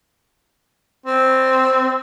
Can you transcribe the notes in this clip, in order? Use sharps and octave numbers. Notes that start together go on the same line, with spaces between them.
C4